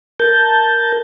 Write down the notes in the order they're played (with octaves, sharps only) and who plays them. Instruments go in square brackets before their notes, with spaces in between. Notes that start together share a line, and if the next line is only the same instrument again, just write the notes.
[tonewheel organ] A#4 A5 G6